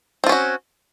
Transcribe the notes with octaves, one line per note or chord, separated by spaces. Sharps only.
C4 C#4 F4 F#4